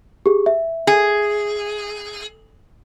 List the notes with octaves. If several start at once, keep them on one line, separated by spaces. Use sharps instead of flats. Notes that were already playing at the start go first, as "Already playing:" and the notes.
G4 G#4
E5
G#4